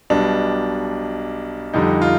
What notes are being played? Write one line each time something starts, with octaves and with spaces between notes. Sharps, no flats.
B1 B2 G3 D4
F2 D3 G3 D#4
F4